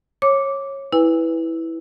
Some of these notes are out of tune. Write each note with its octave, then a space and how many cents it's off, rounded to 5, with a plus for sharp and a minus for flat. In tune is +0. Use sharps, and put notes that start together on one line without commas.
C#5 -20 D6 -10
E4 -10 B4 +0 G#5 -30